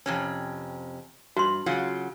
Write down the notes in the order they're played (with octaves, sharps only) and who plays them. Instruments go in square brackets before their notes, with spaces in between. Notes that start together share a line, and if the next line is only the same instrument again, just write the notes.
[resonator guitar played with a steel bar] F2 C3 C#4
[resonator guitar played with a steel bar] G2 [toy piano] F#4 C6
[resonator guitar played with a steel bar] C#3 F#3 F4